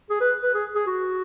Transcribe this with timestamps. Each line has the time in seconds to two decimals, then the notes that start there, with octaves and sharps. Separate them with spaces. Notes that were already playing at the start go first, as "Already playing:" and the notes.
0.10 G#4
0.21 B4
0.43 B4
0.54 G#4
0.75 G#4
0.87 F#4